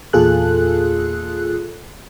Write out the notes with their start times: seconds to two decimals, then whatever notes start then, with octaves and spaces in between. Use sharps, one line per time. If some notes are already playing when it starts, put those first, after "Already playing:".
0.13 E2 A#2 F4 G#4 A4 F#6